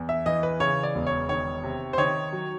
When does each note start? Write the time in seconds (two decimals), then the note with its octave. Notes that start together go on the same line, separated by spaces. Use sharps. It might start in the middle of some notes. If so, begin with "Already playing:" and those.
Already playing: E2
0.09 E5
0.26 E3 D#5
0.43 B4
0.60 C#3 C#5
0.83 D5
0.95 E1
1.07 C#5
1.29 D#3 C#5
1.64 C3
1.93 C5
1.98 D#3 C#5
2.33 F#3